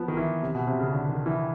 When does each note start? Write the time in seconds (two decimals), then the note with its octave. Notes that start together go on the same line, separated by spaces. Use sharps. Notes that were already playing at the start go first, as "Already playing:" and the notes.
Already playing: F3 B3
0.08 D#3
0.17 E3
0.42 C3
0.55 B2
0.67 C3
0.80 C#3
0.93 D3
1.09 D#3
1.26 E3